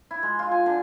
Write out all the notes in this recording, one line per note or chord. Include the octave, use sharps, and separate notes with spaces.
E4
G#3
F4
G#5
D3